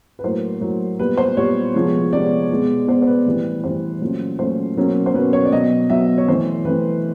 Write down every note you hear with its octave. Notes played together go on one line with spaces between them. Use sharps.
B4
A2 F#3 A#3 C5
A2 F#3 A#3
A#2 G3 B3 B4
C5
A#2 G3 B3 C#5
C3 F3 G#3 B3
C3 F3 G#3 B3 D5
B2 G#3 B3
B2 G#3 B3 C5
C5
B4
A2 E3 G3 C4
A2 E3 G3 C4 C5
A#2 F#3 A3 C#4
A#2 F#3 A3 C#4 C5
B2 F#3 A#3 C#4
C5
B2 F#3 A#3 C#4 B4
C#5
D5
B2 F#3 B3 D#5
B2 F#3 B3 E5
C#5
E3 A3 C4 C5
E3 A3 C4 B4